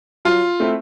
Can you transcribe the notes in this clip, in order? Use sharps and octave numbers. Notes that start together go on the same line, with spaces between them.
F#3 F4
A3 C4 E4